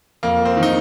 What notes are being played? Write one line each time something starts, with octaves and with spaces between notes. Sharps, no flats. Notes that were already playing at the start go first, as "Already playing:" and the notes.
F2 A#3
C4
D#3
D#4